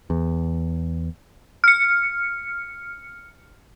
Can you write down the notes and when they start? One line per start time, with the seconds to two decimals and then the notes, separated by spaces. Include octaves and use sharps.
0.10 E2
1.64 F6 C#7